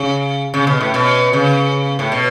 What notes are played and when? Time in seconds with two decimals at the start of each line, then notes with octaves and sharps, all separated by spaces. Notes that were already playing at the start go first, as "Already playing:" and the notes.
Already playing: C#3
0.54 C#3
0.67 B2
0.80 A2
0.94 B2
1.33 C#3
1.99 A2
2.12 B2